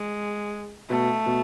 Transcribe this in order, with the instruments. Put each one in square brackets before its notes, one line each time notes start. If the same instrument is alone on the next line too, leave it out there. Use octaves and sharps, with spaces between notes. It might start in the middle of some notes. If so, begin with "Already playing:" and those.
Already playing: [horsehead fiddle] G#3
[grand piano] B2 [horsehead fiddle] A3
[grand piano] B2